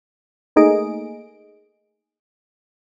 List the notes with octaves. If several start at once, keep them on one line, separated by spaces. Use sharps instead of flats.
A3 A#3 D#4 G#4 D#5 D7